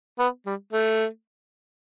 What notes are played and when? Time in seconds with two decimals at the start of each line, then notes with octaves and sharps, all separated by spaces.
0.19 B3
0.46 G3
0.73 A3